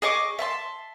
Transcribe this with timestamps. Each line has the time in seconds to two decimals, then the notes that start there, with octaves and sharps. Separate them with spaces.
0.02 G#4 D#5 C#6 D6
0.39 E5 A5 C6